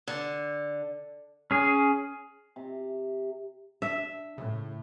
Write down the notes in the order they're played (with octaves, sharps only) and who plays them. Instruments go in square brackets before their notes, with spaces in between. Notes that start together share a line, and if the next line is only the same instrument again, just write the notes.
[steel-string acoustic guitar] D3
[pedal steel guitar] C#4 G#4
[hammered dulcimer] C3
[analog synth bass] D4 [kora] E5
[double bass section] A2 [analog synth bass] C#3